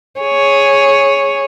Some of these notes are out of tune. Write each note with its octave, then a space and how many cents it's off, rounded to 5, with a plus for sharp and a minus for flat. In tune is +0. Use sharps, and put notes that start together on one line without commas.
G#4 +0 C#5 +0